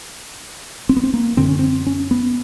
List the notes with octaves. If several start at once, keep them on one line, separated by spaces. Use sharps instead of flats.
C4
B3
C4
A#3
F#2 D3 C4
C#4
C4
C#4
B3